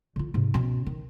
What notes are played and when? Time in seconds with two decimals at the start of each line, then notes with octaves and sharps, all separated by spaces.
0.16 D3 F4
0.34 G#2 C3
0.54 B2 C#4
0.86 D#3